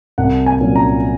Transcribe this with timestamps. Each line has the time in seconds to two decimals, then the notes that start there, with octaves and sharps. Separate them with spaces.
0.18 C2 F#5
0.46 G#5
0.61 A#2 F#3 C#4
0.76 A#5